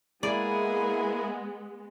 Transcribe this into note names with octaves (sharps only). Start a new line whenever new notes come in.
G#3 A#3 B3 E4 G#4 D5